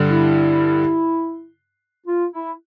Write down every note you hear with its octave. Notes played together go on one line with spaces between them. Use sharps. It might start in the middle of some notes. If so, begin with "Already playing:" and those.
Already playing: G2 D3 G3
E4
F4
E4